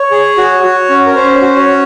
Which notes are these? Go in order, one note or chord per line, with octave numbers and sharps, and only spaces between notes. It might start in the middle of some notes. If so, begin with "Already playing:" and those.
Already playing: C#5
G#4
F#4
F#4
C#4
A#4
C#4 C5
F#4
C#5
C#4